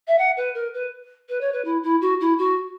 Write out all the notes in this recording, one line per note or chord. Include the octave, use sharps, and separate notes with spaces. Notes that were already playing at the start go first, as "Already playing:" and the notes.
E5
F#5
B4
A#4
B4
B4
C#5
B4
E4
E4
F#4
E4
F#4